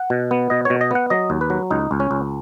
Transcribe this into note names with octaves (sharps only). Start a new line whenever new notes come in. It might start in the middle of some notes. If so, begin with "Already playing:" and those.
Already playing: F#5
B2
B3
B2 D#5
B2 C#5
D#5
B3 F#5
F#3 D#5
D#2
B4
F#3
C#2 D#4
C#2
C#4
C#2